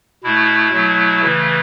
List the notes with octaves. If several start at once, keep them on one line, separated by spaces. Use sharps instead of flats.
B2 A3 E4
B2 F#3 A3
C#3 E3 A3